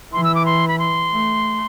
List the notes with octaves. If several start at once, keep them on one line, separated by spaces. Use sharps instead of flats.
E3 C6
E6
D6
C6
B5
C6
A3